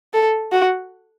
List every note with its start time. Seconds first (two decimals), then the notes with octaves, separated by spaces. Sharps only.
0.14 A4
0.52 F#4